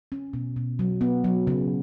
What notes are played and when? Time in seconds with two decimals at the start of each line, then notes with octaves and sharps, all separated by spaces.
0.12 C#4
0.33 B2
0.56 B2
0.79 F#3
1.01 B3
1.24 F#3
1.47 C#3